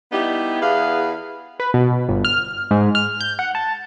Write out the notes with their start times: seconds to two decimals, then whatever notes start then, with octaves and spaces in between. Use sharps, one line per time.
0.12 G3 B3 D#4 E4 G4
0.61 E2 G#4 B4 F5
1.60 B4
1.74 B2
2.09 G1
2.25 F6
2.71 G#2
2.95 F6
3.21 G6
3.39 F#5
3.55 A5